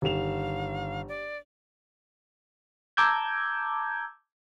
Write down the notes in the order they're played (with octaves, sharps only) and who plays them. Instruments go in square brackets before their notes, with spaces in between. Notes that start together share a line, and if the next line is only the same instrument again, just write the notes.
[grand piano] G1 D#3 E7 [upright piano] G4 F7 [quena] F5
[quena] D5
[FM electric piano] A5 A#5 D6 E6 G6 G#6